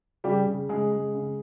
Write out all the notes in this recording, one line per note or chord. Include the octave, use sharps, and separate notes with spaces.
C#3 G3 G4
C#3
C#3 G#3 G#4
G#3
C#3